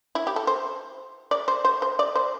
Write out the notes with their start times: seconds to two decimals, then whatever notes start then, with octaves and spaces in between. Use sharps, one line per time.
0.15 E4
0.27 G4
0.36 A4
0.47 C5
1.31 D5
1.48 C5
1.65 C5
1.82 C5
1.99 D5
2.15 C5